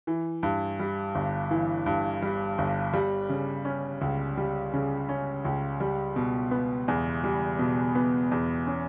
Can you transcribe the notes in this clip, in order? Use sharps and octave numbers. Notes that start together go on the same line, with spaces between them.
E3
G2
G3
G1
E3
G2
G3
G1
G3
C#3
C#4
C#2
G3
C#3
C#4
C#2
G3
B2
B3
E2
G3
B2
B3
E2
C#4